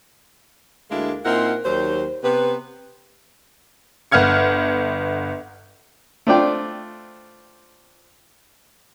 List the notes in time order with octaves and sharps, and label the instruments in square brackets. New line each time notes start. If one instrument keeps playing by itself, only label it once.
[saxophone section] D2 G#3 A#3 D4 E4 A#4
A#2 C4 D#4 E4 A#4 F#5
D#2 D#3 F#3 C5
C3 B3 B4
[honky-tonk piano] G1 F#5 F6 G#6 C#7
[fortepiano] A3 C4 D4 F4 D5 G5